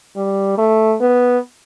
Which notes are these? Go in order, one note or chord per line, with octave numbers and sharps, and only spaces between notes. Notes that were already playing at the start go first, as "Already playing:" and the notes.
G3
A3
B3